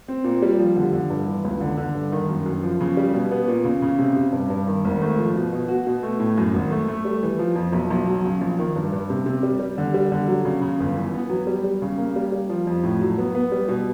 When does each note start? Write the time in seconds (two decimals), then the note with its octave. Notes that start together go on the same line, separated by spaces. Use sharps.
0.08 C4
0.24 A#2
0.42 G3
0.59 F3
0.76 D3
0.93 D3
1.10 G2
1.26 E3
1.44 C#2
1.60 D3
1.77 D3
1.95 G2
2.12 D#3
2.29 F#2
2.46 F#2
2.63 F3
2.81 C#3
2.97 G3
3.14 B2
3.31 B3
3.48 A#2
3.64 C#3
3.82 C#3
3.99 C3
4.17 C3
4.32 G2
4.50 G2
4.67 D#3
4.85 G#1
5.02 A3
5.18 F3
5.36 B2
5.53 B2
5.68 F#4
5.87 B2
6.03 A3
6.20 A2
6.38 F#2
6.54 G#1
6.71 A3
6.88 A3
7.05 G3
7.23 E3
7.39 F3
7.56 F2
7.73 B1
7.90 B1
8.07 F#3
8.25 C#3
8.41 A#1
8.59 D#3
8.76 G2
8.92 G2
9.10 C3
9.26 C3
9.43 G3
9.60 G3
9.78 D3
9.94 G3
10.12 D3
10.28 F#3
10.45 C#3
10.62 C#3
10.80 G1
10.97 E3
11.14 B3
11.30 F#3
11.47 G3
11.64 G3
11.82 C#3
11.98 A#3
12.16 G3
12.32 G3
12.49 F3
12.67 F2
12.83 A2
13.01 F#3
13.18 B3
13.35 B3
13.52 G3
13.68 B2